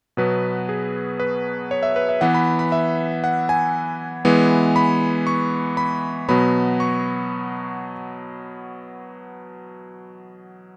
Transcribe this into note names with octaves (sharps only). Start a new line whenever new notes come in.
B2 F#3 B3 B4
G#4
B4
C#5
E5
B4
E5
E3 B3 F#5
B5
B5
E5
F#5
G#5
E3 G#3 B3
B5
C#6
B5
B2 F#3 B3 B5
C#6